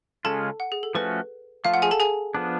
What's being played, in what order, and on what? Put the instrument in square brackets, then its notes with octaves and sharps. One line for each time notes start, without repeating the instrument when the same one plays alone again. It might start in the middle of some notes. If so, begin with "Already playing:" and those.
[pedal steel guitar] C#3 G#3 C#4 F4 [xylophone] A4 A5
[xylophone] F#5
G#4
A4
[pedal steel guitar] F3 A3 C#4 F#4 [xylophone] B4
[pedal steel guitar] F3 A3 F4 [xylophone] F5
[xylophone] F#5
G#4 G#5
A4 A5
G#4 G#5
[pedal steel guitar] F3 B3 D4